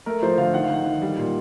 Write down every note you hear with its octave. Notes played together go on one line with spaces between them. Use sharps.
A3 A#4
F3 C5
D3 F5
D#3 F#5
F5
D#3 F#5
D#3
G3
A#2